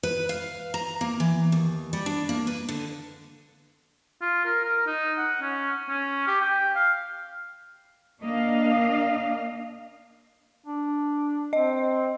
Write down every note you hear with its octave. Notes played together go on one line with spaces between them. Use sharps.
B4
F5
A#5
A#3
E3
D#2
G3
D4
A#3
B4
D3
F4
A#4
A#4
D#4
F#5
C#4
C#4
G4
G5
F5
A#3 D4 D#5 F5
D4
C4 D#5